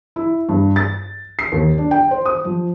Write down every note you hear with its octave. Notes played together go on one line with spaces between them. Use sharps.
E4
G2
A6
C7
D#2
D4
G5
C5
D#6
F3